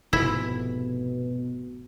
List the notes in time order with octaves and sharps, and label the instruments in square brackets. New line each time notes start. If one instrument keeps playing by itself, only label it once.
[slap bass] F1 G#2 [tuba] B2 [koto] E4